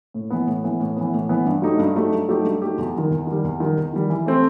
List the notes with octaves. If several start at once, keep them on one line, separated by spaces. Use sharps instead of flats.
A2
E3 B3
A2
E3 B3
A2
E3 B3
A2
E3 B3
G2
F#3 A3 D#4 G4
G2
F#3 A3 D#4 G4
G2
F#3 A3 D#4 G4
G2
F#3 A3 D#4 G4
E2
D#3 G3
E2
D#3 G3
E2
D#3 G3
E2
D#3 G3
E3
A3 C4